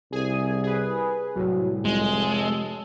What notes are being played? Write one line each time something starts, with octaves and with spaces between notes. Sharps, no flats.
C2 G#4 G#5
G#4 B4
C2 A2 F#3
F1 G#3
A4